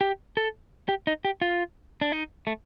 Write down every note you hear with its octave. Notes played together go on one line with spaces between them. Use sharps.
G4
A4
G4
D#4
G4
F4
D4
D#4
A3